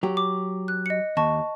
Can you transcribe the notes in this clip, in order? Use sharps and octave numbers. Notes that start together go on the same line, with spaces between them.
F#3 G4
D6
F#6
D#5 C#7
D#2 D#5 A5 C#6